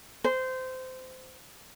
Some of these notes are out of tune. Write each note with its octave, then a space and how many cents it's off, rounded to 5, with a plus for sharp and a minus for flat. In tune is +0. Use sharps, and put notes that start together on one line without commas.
C5 -20